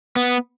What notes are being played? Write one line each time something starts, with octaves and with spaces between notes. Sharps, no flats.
B3